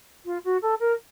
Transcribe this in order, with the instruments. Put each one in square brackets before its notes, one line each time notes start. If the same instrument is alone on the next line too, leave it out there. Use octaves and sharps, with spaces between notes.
[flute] F4
F#4
A4
A#4